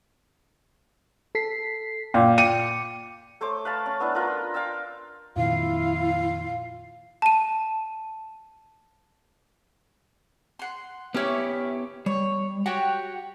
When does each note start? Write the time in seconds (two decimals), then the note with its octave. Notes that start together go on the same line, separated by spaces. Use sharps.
1.35 A4 B6 C7
2.14 A#2 F5 G5
2.38 G5 D6 C#7 D#7
3.41 A3 C5 C#5 D6
3.65 B4 F5 A5
3.86 C#4
4.00 B3 D4 E4
4.15 F4 A#4 B4
4.54 F5 G5 D6 E6
5.36 F2 A#2 D#3 E4 F4 F5
7.22 A5 D#7
10.59 F#5 C6
11.14 B3 C#4 E4 G4 C#5 D5
12.06 G3 C#5
12.66 F#4 G4 C#5 F#5 G5